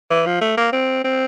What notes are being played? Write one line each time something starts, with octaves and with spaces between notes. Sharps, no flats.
E3
F3
A3
A#3
C4
C4